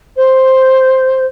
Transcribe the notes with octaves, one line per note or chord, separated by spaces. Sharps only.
C5